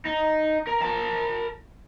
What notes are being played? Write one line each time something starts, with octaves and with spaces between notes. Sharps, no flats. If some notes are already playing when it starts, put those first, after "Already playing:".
D#4
A#4
A#4 A5